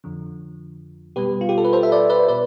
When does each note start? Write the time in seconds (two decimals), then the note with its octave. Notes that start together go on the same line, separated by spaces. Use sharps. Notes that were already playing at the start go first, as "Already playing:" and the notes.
0.04 F2 D3 F3
1.16 B2 G3 G4 B4
1.41 F4
1.49 G4
1.58 A4
1.65 B4
1.73 A4 C5
1.83 E5
1.92 B4 D5
2.10 B4 D5
2.28 B2 B4 D5